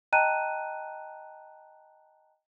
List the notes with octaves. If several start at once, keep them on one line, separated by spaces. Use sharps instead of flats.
D#5 G5 A5 A#5 F#6 D#7